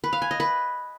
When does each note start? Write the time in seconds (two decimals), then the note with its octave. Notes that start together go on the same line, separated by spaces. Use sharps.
0.04 B4
0.13 F5
0.22 G#5
0.31 D#5
0.40 B4